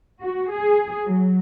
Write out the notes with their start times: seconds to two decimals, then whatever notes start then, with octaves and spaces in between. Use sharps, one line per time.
0.23 F#4
0.53 G#4
1.07 F#3